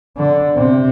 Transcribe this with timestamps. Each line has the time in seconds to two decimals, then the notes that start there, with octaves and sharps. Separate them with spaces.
0.17 D3
0.56 C3